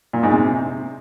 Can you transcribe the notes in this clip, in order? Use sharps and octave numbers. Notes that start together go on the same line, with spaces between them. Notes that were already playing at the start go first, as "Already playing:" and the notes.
A#2
G#2
C3